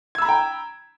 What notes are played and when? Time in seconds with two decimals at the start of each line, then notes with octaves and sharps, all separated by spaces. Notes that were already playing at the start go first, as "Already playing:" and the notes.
0.15 G#6
0.18 E6
0.22 B5
0.25 A#5
0.29 G5